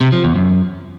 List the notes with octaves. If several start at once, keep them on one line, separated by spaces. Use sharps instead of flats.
C3
F3
E2
F#2